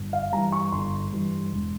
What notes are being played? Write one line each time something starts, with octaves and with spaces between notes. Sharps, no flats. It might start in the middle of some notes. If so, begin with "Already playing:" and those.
Already playing: G1
F5
G2 E3 A#5
C#6
G1 C6
G2 E3
E1